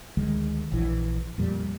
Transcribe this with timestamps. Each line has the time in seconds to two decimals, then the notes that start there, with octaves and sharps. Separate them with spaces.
0.17 D2 D#3 G#3
0.72 A#1 E3
1.38 F2 A#2 G3